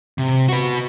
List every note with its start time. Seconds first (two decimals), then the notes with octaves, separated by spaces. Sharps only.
0.18 C3
0.49 F#4 B4